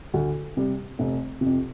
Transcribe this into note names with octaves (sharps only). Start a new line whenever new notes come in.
D2
C3 G3
F1
C3
F2